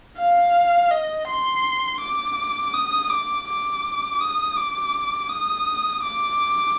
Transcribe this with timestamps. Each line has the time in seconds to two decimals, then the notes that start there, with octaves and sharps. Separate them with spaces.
0.18 F5
0.91 D#5
1.28 C6
2.01 D6
2.74 D#6
3.10 D6
3.48 D6
4.21 D#6
4.57 D6
5.30 D#6
6.03 D6